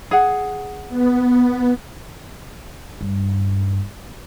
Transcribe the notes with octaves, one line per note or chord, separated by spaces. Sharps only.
G#4 F#5
B3
G2